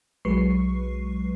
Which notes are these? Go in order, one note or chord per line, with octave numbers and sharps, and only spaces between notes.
B1 F#3 G#3 B4 C#6 C7